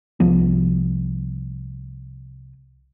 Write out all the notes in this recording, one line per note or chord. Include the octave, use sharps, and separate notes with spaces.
C2 F3 B3